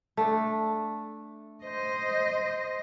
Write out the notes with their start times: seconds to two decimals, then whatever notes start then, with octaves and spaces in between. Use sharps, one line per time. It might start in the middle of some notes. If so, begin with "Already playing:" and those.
0.17 A3 D4
1.63 C5 D#5